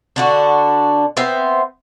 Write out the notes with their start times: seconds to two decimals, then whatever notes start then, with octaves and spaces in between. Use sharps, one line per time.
0.16 D3 D4 F#4
1.17 B3 C4 C5 E5